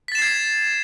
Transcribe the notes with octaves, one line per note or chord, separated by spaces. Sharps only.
G#6 A6 B6 C7 E7